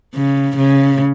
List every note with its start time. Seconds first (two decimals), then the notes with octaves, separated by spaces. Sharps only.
0.14 C#3
0.57 C#3